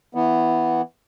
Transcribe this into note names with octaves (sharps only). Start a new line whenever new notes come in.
E3 B3